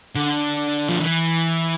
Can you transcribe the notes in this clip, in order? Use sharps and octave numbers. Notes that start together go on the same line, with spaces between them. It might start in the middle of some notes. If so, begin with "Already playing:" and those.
D3
F3
E3